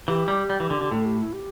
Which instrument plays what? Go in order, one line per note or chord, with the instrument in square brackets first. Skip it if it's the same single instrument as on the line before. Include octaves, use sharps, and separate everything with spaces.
[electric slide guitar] E3 [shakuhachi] G4
[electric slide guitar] G3
G3
E3
D3
D3
[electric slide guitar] A2 [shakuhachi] A4
[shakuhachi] G4
E4
G4